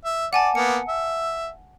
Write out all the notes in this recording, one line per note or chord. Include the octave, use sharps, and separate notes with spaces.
E5
D5 F#5 G#5 A5
A#3 B3 C#7
E5